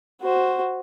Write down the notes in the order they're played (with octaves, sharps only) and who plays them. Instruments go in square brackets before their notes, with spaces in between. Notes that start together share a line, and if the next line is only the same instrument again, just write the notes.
[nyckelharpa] F#4 C5